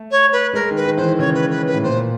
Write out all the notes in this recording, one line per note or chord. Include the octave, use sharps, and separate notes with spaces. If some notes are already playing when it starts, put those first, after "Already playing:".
Already playing: A3
C#5
B4
G#3 A#4
D#3 B4
D#3
E3 C5
D#3
C#3 C#5
B4
B4
B4
A2
A#2 C5